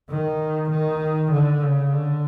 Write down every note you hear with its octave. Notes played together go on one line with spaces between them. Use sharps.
D#3
D#3
D3
C#3
D3